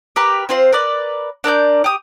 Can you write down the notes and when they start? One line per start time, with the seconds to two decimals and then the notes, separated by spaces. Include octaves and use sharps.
0.16 G4 A#4 B4
0.49 C4 F4 C5 C6
0.72 A#4 B4 D5
1.44 D4 A#4 D5 G6
1.84 G4 D#6